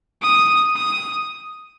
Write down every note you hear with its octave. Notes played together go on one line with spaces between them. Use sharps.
D#6
D#6